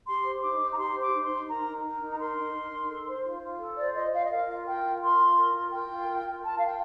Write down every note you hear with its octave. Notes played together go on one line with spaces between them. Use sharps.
G4 C6
C5
D#4 D6
D#4
A#5
G4 C6
C5
D6
D#4
C6
D#4
A#4 A#5
D#4
A#4
D#4
A#5
A#4 C6
D#4
A#4
D#4
A4
C5
F4
F4
A4
C5 D5
F4 D#5
F4 F5
D#5
A#4 F5
F4
A#4 G5
F4
A#4 C6
F4
A#4
F4
A#4 G5
F4
A#4
F4
A#4 A5
F4 F5
G5